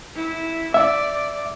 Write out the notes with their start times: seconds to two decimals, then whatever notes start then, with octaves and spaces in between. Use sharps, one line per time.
0.15 E4
0.74 D5 E5